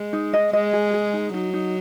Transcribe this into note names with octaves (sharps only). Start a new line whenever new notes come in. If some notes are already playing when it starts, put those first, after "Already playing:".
Already playing: G#3
D#4
D#5
G#3 D#5
G#4
G#4
D#4
F#3 D#4
D#4